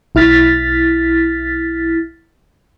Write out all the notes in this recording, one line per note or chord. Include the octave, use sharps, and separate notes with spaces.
B1 E4 F6 A6 B6